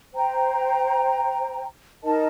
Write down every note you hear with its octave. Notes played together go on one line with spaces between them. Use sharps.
C5 G5 A#5
D#4 A#4 D#5 A5